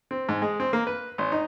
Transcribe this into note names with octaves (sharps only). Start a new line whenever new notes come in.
C4
G#2
G#3
C4
A#3
B4
G#1
D#4